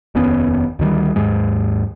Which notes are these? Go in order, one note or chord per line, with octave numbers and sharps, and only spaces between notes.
F1 D#2 B3 C#4
D2 D#3 G3
D#2 G#2 G#3